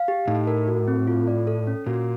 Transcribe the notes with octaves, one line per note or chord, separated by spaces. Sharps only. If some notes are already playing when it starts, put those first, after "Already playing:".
Already playing: F5
G4
A2 D#4
A#4
F#4
C4
F4
D5
A4
C#4
A#2 F#4